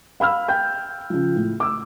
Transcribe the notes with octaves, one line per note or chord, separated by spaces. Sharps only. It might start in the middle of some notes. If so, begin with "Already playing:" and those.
F5 B5 E6 F6
G5 G6
C#3 F3
A2
D6 E6